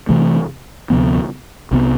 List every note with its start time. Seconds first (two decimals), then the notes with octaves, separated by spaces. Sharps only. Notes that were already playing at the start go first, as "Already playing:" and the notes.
0.09 C3 E3 A3
0.90 D2 C3 F3 B3
1.71 C2 C3 E3 B3